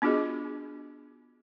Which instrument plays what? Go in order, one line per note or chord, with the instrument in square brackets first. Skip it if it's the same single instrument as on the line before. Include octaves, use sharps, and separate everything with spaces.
[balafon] B3 D4 F4 F#4 G#4 D#5